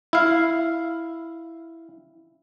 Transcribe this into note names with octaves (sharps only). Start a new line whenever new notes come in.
E4 F5